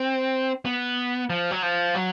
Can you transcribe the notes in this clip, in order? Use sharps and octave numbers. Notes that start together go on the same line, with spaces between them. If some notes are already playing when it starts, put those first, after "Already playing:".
Already playing: C4
B3
F3
F#3
F3
F#3